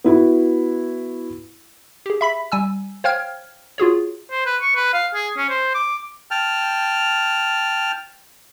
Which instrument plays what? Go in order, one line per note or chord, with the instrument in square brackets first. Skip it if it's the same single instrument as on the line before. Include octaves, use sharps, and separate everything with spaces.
[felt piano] B3 E4 F#4
[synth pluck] G4 G#4
E5 B5 B6
G3 G#5 E6
C5 C#5 F5 G5 F6 G#6
F4 F#4 G#4 C#5
[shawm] C5
B4
C#6
B4
F5
G#4
C#4
C5
D6
[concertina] G5 A5 F6